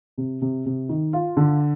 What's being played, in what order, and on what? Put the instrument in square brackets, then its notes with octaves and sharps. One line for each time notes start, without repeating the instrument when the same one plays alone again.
[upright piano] C3
C3
C3
D#3
F4
D3